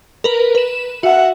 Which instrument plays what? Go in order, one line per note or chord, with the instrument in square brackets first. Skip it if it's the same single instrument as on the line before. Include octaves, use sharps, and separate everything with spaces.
[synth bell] A#4 B4
B4 E7
[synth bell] F#4 [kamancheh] E5 F#5